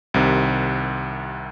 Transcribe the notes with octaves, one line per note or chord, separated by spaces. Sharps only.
C2 C3 D#3